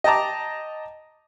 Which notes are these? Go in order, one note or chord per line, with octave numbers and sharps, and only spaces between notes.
D#5 G5 A5 A#5 D6